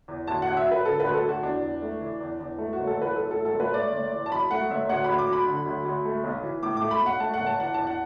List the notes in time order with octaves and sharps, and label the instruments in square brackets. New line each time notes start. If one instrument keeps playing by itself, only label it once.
[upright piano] E2
D2 A5
F#5
D2
E5
F#3
B4
D3 A4
B4
D2
A4
D2
F#4
E2 D4
E2
A3
E3
E2
E2
A3
F#4
F#1
A4
E3 B4
F#2 A4
A3 A4
A4
F#1 B4
A3 D5
F#1
E3
A5
F#2 B5
A3 F#5
F#1 E5
D2 F#5
D2 B5
D6
F#3 B5
D3
D2
D2
A3
B1
E3
A2 D6
A3 D6
B5
B1 F#5
A3 A5
F#5
F#1
A5
E3 F#5
E2 A5
F#5